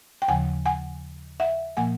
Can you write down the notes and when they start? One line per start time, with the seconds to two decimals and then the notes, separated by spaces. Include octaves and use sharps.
0.22 G5
0.28 D#2 C#3 F3 F#5 G#5
0.66 F#5 G#5
1.40 E5 F#5
1.77 A#2 F3 A#3 F#5 G#5